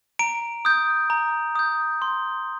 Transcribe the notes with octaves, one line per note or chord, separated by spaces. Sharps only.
A#5 D7
D#6 G6
A#5
D#6 G6
C6